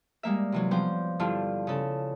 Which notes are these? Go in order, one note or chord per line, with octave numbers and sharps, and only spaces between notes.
G3 G#3 A#3 E5
C3 E3 F#3
F3 G3 B3 C4 C5
G2 D3 D4 E4 F4
C#3 A4